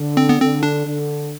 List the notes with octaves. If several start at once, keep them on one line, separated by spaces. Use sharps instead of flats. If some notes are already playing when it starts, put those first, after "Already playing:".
Already playing: D3
C4
B3
D3 C4
D4
D3